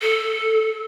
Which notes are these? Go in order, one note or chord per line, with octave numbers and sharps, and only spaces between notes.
A4